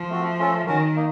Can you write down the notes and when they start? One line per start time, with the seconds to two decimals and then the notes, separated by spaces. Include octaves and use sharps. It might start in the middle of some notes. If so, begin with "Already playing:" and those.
Already playing: F3
0.10 A3 C4 F#4
0.39 A3 C#4 F4 A4
0.67 D#3 C#4 F#4 A#4
0.96 A#3 D#4